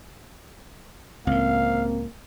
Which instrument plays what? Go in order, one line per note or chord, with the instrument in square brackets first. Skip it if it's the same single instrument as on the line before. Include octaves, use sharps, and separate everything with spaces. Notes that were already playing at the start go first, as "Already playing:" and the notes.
[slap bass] C#2 A2 [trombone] A#3 [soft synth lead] C4 [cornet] F5